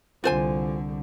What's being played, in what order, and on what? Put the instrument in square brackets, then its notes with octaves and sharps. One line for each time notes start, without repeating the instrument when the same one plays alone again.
[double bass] C2 D3 [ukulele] F4 C5 G#5